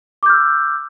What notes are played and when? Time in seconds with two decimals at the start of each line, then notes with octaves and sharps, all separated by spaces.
0.23 D6
0.26 G6
0.29 F6
0.33 E6